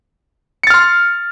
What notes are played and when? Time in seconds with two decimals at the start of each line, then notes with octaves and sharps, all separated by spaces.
0.63 C#7
0.67 A6
0.70 F6
0.74 C6